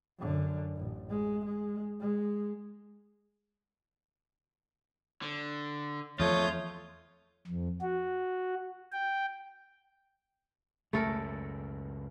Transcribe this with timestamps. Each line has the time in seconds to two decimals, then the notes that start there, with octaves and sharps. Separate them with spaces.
0.19 F#2 D3
0.77 A1
1.10 G#3
1.46 G#3
2.01 G#3
5.22 D3
6.19 E2 F3 A3 F4 C#5 D#6 G6
7.47 F2
7.81 F#4
8.92 G5
10.93 C#2 F#2 B2 A3 A4 A#4